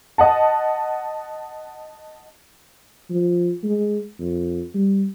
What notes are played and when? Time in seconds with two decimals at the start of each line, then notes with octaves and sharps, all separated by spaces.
0.18 D#5 F#5 A5
3.10 F3
3.63 G#3
4.19 F2
4.75 G3